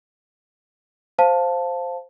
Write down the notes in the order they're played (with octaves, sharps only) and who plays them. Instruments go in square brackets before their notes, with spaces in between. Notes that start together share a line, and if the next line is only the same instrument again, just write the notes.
[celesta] C5 F5 A5